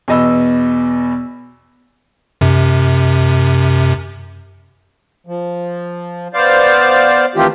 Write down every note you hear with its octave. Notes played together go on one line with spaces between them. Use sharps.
E2 B2 D#5 B5 E6
F#2 C3
F3
B3 C5 D5 F5
D#3 E3 A3 C4 F4 G4